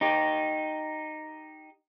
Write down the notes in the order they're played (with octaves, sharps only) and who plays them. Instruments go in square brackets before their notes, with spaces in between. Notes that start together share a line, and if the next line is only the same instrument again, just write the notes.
[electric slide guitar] D#4 G4